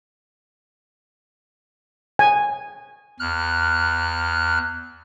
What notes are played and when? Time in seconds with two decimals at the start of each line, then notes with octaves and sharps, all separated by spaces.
2.19 G#5
3.20 E2 F6 F#6